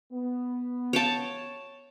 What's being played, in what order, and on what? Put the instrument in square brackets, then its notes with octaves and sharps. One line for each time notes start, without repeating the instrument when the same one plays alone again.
[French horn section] B3
[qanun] C#5 G5 A5